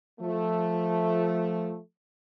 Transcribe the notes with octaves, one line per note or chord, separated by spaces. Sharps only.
F3 A3